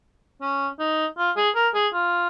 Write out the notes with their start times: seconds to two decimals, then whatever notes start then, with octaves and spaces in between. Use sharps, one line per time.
0.41 C#4
0.80 D#4
1.18 F4
1.36 G#4
1.55 A#4
1.74 G#4
1.93 F4